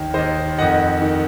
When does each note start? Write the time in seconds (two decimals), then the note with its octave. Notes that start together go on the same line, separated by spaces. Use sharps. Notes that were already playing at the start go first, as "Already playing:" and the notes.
Already playing: D#2 D#3
0.14 D#2 D#3 C5 D#5
0.58 F2 D#3 D#5 F#5
1.02 D#3